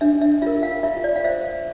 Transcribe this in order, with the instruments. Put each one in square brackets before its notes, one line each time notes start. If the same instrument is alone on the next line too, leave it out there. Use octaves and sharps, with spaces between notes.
[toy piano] D4 E5
E5
F4 A#4 E5
F5
F4 E5
D5
F5
C5 E5